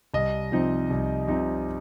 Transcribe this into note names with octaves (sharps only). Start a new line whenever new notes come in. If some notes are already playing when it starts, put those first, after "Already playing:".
C2 D#5
C3 F3 C4 D#4
C2
C3 F3 C4 D#4